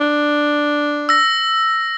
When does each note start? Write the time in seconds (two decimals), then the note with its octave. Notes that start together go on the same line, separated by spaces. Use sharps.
0.01 D4
1.09 E6 A#6